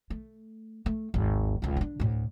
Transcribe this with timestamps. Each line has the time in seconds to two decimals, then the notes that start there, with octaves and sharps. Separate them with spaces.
0.10 A3
0.86 A3
1.14 G#1 D#2
1.62 F1 C#2
1.77 D3 D4
2.00 D2 A2